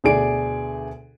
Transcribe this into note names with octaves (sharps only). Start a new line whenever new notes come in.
D2 B2 D3 G#4 D5 D7